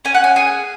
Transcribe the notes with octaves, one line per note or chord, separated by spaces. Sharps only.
C#4 G#5
F#5
G#5
G#4 G#5